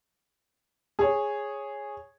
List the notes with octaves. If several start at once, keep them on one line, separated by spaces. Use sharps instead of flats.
G#4 C#5